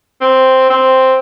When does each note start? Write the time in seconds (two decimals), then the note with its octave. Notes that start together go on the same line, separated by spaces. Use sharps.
0.21 C4
0.70 C4